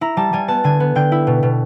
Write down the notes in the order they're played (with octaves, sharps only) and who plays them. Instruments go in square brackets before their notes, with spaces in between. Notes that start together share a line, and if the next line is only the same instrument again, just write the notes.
[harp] E4 A#5
G3 A5
G3 G#5
B3 A5
D3 G#5
B3
D3 G5
E4
B2
B2